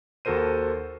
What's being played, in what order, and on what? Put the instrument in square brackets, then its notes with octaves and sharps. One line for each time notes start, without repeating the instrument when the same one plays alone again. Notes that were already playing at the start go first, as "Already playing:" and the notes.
[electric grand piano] D#2 F#4 A4 A#4 C5 D#7